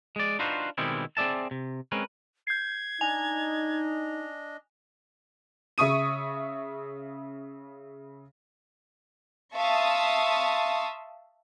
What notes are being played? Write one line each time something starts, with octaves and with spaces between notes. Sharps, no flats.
G#3 D5
D4 D#4 F4 F#4 B4 C5
B2 D#3 G3 G#3 C4 E4
C4 G#4 D5 E5 A5
C3
G#3 C4 C#4 A#4 B4
G6 G#6 C7
D4 D#4 D#5 G#5 F7
C#3 E5 C#6 D#6 D#7
E5 F5 A5 C6 C#6 D#6